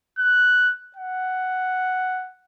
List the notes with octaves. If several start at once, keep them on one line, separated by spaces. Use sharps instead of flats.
F#6
F#5